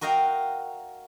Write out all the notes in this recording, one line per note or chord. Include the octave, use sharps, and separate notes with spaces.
F#4 A#4 D#5 F5 G5